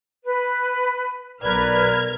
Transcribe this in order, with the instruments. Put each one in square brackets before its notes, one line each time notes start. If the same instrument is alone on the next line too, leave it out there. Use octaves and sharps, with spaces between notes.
[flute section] B4
[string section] B1 F6 G#6 [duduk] A#4 [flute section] B4 D5